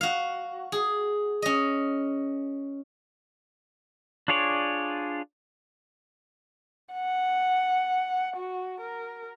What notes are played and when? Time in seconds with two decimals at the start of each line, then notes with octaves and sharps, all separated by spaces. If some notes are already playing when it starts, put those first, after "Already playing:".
0.01 F#4 F5
0.72 G#4
1.42 C#4 D#5
4.28 D4 F4 G#4 C#5 D5
6.94 F#5
8.36 F#4
8.80 A#4